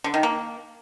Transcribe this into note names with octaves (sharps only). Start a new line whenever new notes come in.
D3
D#3
A#3